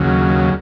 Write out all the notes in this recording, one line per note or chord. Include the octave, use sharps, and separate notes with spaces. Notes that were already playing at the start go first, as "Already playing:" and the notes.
Already playing: D#2 C#3 F#3